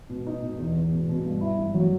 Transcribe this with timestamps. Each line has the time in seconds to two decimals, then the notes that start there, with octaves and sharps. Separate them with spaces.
0.10 B2
0.27 D#4
0.42 B2
0.58 E2
0.75 E2
0.92 B2
1.09 B2
1.25 G2
1.41 E4
1.59 G2
1.74 F#3